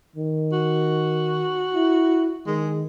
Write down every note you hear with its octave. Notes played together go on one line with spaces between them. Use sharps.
D#3
F#4
E4
D#3 G#3